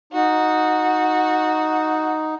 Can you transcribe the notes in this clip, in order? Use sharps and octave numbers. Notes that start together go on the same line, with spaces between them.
D#4 F#4